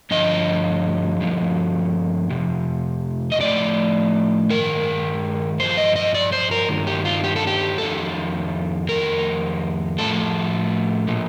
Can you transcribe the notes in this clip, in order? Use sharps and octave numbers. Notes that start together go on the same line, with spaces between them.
G2 D3 F3 D#5
G2 D3 F3
F2 C3
D#5
A2 F3 D5
G2 D#3 A#4
G2 F3 C5
D#5
D#5
D5
C5
A#4
G2 D#3
G4
F4
G4
A4
G4
F2 D#3 A4
F2 D#3 A#4
A2 F3 A4
A#2 F3